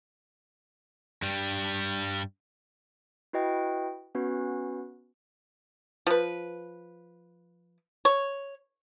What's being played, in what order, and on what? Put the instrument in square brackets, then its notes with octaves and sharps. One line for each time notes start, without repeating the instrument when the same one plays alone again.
[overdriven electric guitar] G2 G3
[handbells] E4 F#4 B4 D#5 G5
B3 C#4 F#4 B4
[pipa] F3 B4
C#5